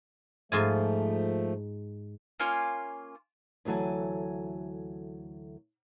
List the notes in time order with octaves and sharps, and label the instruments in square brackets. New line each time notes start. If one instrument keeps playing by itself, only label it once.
[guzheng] G#2 F4 G#5 [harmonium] F3 A3
[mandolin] A#3 C#4 F4 G#5
[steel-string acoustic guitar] D2 E3 F#3 A4 G#5